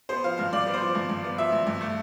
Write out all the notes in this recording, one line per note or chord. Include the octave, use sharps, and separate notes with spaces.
B3 C5
F3 F5
G2 F5
G2 D5
B3
C5
F3
G2
G2
B3
F3 E5
G2
G2
A3